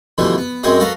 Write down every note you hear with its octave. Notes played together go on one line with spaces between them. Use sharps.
B2 D3 E3 F3 G3 A3
B3
F#2 F#3 G#3 C4 F#4 D#5
F#4 A4 B4 F5 A#5